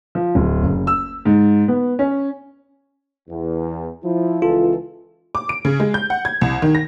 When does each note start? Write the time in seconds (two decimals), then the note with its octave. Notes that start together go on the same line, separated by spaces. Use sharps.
0.15 F3
0.35 D1
0.63 F#1
0.87 E6
1.25 G#2
1.68 B3
1.99 C#4
3.29 E2
4.03 F3 E4
4.42 C#2 E3 F4 A4
5.35 D6
5.49 D7
5.65 C#3
5.80 G#3
5.94 G6
6.10 F#5
6.25 G#6
6.41 C2
6.62 D#3
6.75 A#6